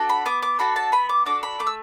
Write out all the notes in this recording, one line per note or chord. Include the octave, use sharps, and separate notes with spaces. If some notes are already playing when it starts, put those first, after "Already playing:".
Already playing: D4 F#4 A4
B5
B3 D6
D6
D4 F#4 A4 B5
A5
B3 B5
D6
D4 F#4 A4 D6
B5
A3 D6
E6